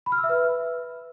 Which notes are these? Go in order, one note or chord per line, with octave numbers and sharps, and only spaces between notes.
B5
F6
E6
E5
B4